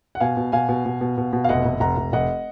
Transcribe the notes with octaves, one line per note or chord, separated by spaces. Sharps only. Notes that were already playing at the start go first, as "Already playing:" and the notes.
F#5
B2 F5 G#5
B2
B2 F5 G#5
B2
B2
B2
B2
B2
F5
F1 D#5 F#5
F1
F1 F#5 A#5
F1
F1 D#5 F#5